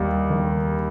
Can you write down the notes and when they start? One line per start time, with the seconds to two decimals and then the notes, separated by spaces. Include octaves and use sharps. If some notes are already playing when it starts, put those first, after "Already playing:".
Already playing: D#2 G3
0.30 D#3